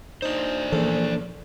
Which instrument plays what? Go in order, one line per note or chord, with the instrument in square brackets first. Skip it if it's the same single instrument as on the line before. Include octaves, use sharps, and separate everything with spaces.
[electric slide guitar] D4 C5 [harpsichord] D#4
[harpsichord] A#1 E2 C#3 [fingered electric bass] E3 [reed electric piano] A#3 A4